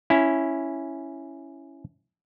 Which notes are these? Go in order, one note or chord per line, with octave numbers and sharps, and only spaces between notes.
C#4 E4